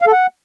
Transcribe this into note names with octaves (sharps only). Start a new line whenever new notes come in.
F5
A4
F#5